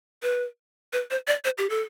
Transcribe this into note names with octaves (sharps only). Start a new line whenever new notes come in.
B4
B4
C5
D5
C5
G4
A4